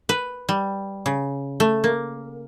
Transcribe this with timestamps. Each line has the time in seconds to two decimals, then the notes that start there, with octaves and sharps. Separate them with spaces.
0.09 B4
0.49 G3
1.06 C#3
1.60 A3
1.84 A#3